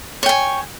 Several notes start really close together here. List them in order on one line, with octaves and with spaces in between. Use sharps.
C#5 G5 G#5